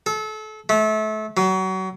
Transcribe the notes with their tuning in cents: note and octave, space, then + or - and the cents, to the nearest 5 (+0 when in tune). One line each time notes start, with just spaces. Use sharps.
A4 -30
A3 -30
F#3 +30